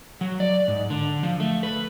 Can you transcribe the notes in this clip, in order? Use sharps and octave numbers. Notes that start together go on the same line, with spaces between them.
F#3
D5
G#2
D3
F3
A3
B4